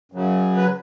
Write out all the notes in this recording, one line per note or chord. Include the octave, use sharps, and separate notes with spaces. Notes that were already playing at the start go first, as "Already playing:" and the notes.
F#2 C#3 F#3
B4